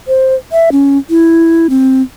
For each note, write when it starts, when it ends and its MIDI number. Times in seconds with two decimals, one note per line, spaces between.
0.08 0.35 72
0.52 0.70 76
0.72 0.98 61
1.10 1.67 64
1.70 2.02 60